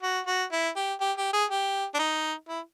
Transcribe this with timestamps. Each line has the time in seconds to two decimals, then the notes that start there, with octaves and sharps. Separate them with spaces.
0.03 F#4
0.27 F#4
0.52 E4
0.76 G4
1.01 G4
1.18 G4
1.33 G#4
1.50 G4
1.95 D4
1.99 D#4
2.49 E4